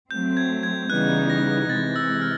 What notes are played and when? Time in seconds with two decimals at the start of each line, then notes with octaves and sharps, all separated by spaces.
0.11 F#3 A3 C4 G6
0.37 G#6
0.63 G#6
0.90 C#3 E3 G3 B3 D#4 F#6
1.30 A#6
1.68 C3 E3 G#3 A6
1.96 E6
2.21 F6